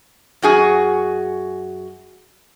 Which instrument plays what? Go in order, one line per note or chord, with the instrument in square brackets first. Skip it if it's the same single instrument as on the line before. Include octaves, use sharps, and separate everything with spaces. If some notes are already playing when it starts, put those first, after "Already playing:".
[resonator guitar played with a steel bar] F#2 F#4 G#4